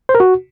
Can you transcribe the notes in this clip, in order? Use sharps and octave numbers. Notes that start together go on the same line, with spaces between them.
C5
A#4
F#4